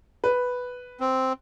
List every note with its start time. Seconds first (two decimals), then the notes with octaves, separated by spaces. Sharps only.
0.24 B4
1.00 C4